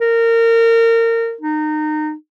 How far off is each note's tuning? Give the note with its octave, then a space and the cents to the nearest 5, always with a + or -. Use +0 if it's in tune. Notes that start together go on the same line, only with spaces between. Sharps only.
A#4 -25
D#4 -25